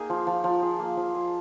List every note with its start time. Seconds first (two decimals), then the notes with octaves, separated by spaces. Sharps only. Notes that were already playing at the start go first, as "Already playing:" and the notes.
Already playing: A#3 D#4 G#4
0.10 F3
0.27 F3
0.44 F3
0.62 G#4
0.79 A#3
0.97 F3
1.14 G#4